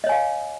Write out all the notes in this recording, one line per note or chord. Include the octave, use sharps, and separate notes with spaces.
C#5 D#5 F5 G#5